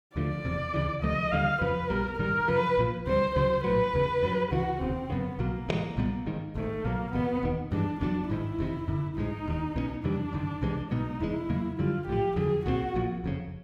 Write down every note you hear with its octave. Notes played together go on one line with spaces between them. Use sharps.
D#2 D3 F3 A3 D5
E1 E2 C3
D2 C#3 E3
D2 C3 F3 A3 D#5
D#2 D3 G3 F5
F2 C#3 F3 B4
B1 B2 G3 A#4
A#1 G#2 D#3 G3 A#4
F#2 C#3 F3 B4
A#1 A#2 F3
D2 C3 E3 G3 C5
C#2 C#3 F#3 C5
A#1 A2 F#3 B4
F1 E2 C#3
F#2 D3 F#3
C#2 C#3 E3 F#4
E1 D#2 C#3 C4
G1 F#2 C#3 B3
B1 B2 F#3 A#3
A1 G2 E3 G#3
B1 A#2 G3 B3
G#1 G#2 D#3
G#1 G#2 D#3 A3
B1 B2 F#3 A#3
F#1 E2 B2 B3
E1 D#2 D#3
G2 E3 G#3 D4
F#1 E2 C#3 F#3 D4
G#1 G#2 D#3 E4
F1 F2 C3 D#3
F#1 F#2 D3
A#1 G#2 D#3 G#3 D#4
E1 D#2 D#3
C2 B2 G#3 C#4
F2 C3 E3 G3 D4
G1 F#2 D#3
C2 C3 E3 G#3
B1 B2 G#3 B3 D#4
F1 E2 B2 G#3 E4
E2 C#3 F#3 A#3
F#1 F#2 D3 G3 F4
A#1 A2 F3 G4
F2 D3 F#3 G#4
C2 A#2 G3 C4 F#4
A#1 A#2 F3
F#1 F2 C#3